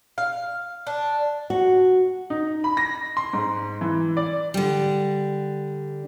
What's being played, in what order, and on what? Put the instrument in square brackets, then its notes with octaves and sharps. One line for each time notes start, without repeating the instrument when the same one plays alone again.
[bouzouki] F5
D4
[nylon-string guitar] F#4
[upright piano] D#4
B5
A#6
C6
G#2
E3
D5
[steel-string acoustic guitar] D3 G3